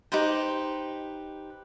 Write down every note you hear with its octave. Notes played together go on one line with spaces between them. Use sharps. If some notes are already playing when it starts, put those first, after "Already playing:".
D#4 G4 B4 C5